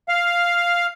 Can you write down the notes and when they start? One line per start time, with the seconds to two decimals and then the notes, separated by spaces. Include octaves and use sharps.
0.08 F5